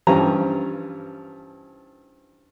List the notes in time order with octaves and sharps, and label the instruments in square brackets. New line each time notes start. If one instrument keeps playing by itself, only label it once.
[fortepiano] G2 E3 F3 C#4 A#5